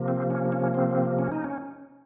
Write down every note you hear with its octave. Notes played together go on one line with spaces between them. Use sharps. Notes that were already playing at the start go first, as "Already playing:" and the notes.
Already playing: C3 F3 A#3
C4
C#4
C#4
C4
C#4
D#4
C#4